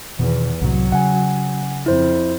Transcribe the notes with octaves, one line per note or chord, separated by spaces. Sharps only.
E2 B2 D#3
C2 A2 C3 F#3
C#3 F#5 G#5
F2 E4 C5